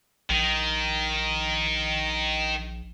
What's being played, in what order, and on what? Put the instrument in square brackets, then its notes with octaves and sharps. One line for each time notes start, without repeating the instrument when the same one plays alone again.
[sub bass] A#1 [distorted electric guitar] D#3